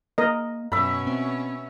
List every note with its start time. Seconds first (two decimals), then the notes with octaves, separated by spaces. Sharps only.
0.18 A#3 A#4 D#5
0.72 F#2 B2 C#4 E5 B5
1.07 C4